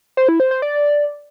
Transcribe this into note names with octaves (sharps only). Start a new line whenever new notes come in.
C5
E4
C5
C5
D5